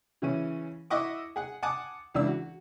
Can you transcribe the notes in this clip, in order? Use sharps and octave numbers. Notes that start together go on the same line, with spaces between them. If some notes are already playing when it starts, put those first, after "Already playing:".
C#3 E3 C#4
E4 D#5 E5 F#5 C#6 D6
G#4 F#5
F#5 G#5 A5 D6 D#6
C#2 E3 D4 E6
F#4